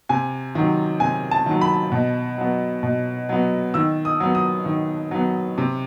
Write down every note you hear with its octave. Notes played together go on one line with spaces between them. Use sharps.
C3 G#5
D#3 F#3
C3 G#5
A5
D#3 F#3
B5
B2
F#3 B3
B2
F#3 B3
D#3 E6
D#6
F#3 B3
D#6
D#3
F#3 B3
C3